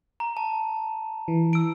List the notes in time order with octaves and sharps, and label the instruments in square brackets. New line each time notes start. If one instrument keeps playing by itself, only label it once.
[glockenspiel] A#5
A5
[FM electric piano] E3
[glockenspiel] E6 D7